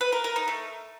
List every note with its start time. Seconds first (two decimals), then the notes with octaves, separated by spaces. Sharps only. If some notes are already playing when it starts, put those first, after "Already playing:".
0.01 B4
0.12 A#4
0.24 A#4
0.36 D#4
0.48 A3